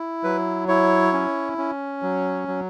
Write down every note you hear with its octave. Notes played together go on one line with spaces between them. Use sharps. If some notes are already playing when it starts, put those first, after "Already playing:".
Already playing: E4
F#3 B4
E4 C#5
C#4
C#4
F#3
F#3